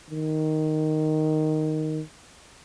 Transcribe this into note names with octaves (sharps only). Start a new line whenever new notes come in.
D#3